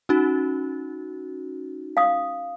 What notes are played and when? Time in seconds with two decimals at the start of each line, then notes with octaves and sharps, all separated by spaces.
0.09 C#4 D#4 F#4
1.97 F5 D#6